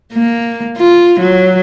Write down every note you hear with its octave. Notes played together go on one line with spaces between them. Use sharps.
A#3
F4
F#3